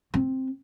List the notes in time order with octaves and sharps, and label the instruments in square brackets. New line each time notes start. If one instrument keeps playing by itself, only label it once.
[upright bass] C4